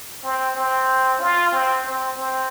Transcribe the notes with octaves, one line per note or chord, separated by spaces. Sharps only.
C4
C4
F4
C4
C4
C4